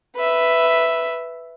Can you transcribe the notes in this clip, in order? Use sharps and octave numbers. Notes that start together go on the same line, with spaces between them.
B4 E5